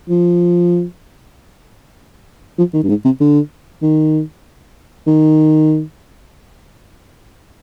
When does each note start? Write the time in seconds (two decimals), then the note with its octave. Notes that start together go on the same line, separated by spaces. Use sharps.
0.09 F3
2.58 F3
2.74 D#3
2.83 G2
2.89 G#2
3.05 C3
3.20 D3
3.83 D#3
5.07 D#3